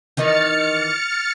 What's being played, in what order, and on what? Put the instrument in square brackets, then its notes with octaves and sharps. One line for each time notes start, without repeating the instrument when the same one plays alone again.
[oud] D#3 E3 D#4 [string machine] F6 A6 C#7